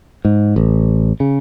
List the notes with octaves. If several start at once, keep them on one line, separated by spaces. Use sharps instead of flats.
G#2
A1
C#3